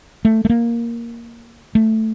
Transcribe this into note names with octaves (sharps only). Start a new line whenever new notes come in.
A3
A3
A#3
A3